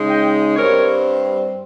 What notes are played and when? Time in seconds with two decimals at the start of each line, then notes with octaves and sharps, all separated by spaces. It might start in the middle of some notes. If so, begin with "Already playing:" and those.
Already playing: C#3 G#3 D#4
0.09 D#5 G5
0.56 G2 G3 C4 A#4 C#5